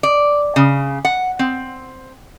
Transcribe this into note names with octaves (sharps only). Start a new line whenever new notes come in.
D5
C#3
F#5
C4